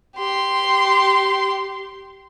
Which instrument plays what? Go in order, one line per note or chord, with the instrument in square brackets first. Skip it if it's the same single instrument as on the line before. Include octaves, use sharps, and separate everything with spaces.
[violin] G4 C6